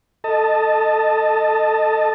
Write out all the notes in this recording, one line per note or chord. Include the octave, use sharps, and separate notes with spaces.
A4 D#5 A5